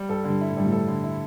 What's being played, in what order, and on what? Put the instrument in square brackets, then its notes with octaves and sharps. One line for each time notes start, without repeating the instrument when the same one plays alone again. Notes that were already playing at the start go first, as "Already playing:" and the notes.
Already playing: [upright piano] G3
[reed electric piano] G2 [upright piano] A4
[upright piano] D3
[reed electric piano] G2
[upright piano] E4
[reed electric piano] A2
[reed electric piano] G2 [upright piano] G3
[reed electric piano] A2
[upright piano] A4
D3
E4